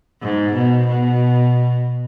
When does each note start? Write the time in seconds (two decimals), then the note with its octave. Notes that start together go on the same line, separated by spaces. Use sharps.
0.22 G#2
0.54 B2
0.87 B2